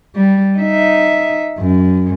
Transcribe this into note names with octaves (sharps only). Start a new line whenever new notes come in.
G3
D#4 E5
F#2